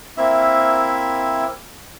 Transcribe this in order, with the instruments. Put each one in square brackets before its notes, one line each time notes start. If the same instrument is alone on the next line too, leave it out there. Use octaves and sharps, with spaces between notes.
[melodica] A#3 C4 E4 E5